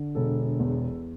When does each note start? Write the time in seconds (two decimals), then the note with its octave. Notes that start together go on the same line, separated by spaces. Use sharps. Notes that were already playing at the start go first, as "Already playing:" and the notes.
Already playing: D3
0.15 E1 A4
0.59 E2